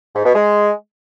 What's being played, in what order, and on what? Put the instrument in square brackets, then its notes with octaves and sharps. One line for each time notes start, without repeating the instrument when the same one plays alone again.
[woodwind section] G#2
B2
G#3